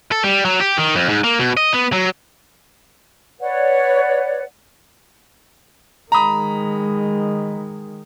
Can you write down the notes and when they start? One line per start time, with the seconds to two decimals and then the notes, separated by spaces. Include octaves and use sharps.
0.12 A4
0.23 G3
0.45 F#3
0.60 G4
0.78 D#3
0.95 F2
1.09 G#2
1.24 A#3
1.39 B2
1.57 D#5
1.74 B3
1.93 F#3
3.40 B4 C#5 D5 F#5
6.12 D#3 G#3 A#5 B5 D#6